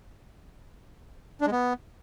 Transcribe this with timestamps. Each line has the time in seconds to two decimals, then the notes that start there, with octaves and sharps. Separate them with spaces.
1.41 D4
1.46 G#3
1.52 B3